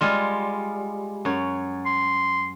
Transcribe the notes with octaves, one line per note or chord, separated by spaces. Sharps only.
G3 G#3 F4
F#2 C#5
C6